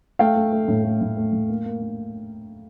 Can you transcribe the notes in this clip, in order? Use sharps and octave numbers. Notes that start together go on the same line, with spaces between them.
A3 F5 G5
A3
A3
A2
A3
A2
A3
A2
A#3
A#3
A#3